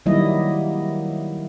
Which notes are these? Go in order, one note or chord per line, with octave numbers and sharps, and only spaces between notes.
D#3 F#3 G3 A#3 E4 D#5